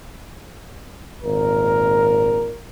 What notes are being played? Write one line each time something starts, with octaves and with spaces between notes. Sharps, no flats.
G#1 A#2 A#4